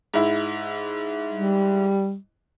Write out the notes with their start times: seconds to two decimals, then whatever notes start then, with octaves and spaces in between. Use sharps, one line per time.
0.14 G#2 E4
1.32 G3